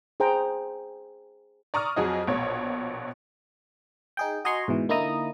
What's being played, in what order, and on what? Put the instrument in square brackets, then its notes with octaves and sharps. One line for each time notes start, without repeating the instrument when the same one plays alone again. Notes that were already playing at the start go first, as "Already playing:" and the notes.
[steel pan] G#4 C5 G5 A#5
[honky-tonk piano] D5 A#5 C#6 D#6 F6
F2 F#3 G#4 D#5
A#1 B2 C#5
[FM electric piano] D#4 G#4 G5
F#4 D#5 G#5 A#5 C6 C#6
G#2 B2 E3
D3 A#3 D#4 E4 A#5 D#6